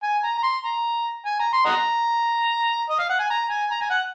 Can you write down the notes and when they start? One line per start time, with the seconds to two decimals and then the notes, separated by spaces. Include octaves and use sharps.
0.03 G#5
0.24 A#5
0.38 A#5
0.43 C6
0.64 A#5
1.26 G#5
1.39 A#5
1.53 C6
1.66 D#5 F#5 A#5
2.89 D#5
2.99 F5
3.10 F#5
3.20 G#5
3.30 A#5
3.50 G#5
3.71 A#5
3.81 G#5
3.90 F#5